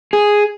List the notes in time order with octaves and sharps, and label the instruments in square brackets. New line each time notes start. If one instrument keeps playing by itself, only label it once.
[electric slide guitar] G#4